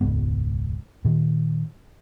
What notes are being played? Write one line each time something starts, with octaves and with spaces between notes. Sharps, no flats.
E1 C#2 G#2 B3
A#2 D#3